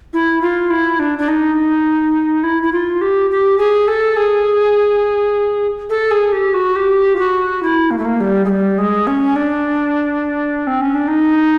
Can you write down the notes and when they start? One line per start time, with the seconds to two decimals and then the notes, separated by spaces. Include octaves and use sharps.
0.13 E4
0.42 F4
0.70 E4
0.99 D4
1.18 D4
1.28 D#4
2.43 E4
2.63 E4
2.72 F4
3.01 G4
3.30 G4
3.58 G#4
3.88 A4
4.17 G#4
5.90 A4
6.11 G#4
6.32 G4
6.54 F#4
6.76 G4
7.15 F4
7.19 F#4
7.63 E4
7.91 A#3
7.98 A3
8.05 A#3
8.20 G3
8.45 G#3
8.49 G3
8.78 G#3
9.07 C#4
9.36 D4
10.67 C4
10.81 C#4
10.94 D4
11.08 D#4